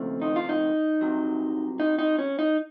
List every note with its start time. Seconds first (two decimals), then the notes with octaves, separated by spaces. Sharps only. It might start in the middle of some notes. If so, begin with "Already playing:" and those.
Already playing: D#2 C#3 F3 A3 C4
0.22 D#4
0.36 F4
0.49 D#4
1.01 C2 C3 F#3
1.80 D#4
1.99 D#4
2.19 C#4
2.39 D#4